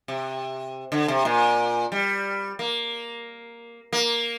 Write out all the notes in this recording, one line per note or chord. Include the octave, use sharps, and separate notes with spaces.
C3
D3
C3
A#2
G3
A#3
A#3